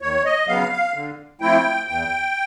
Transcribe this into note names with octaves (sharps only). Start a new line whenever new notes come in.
D#2 C#5
D#5
C#3 F#3 B3 F5
F5
D3
F3 A3 C4 E4 G5
E2 G5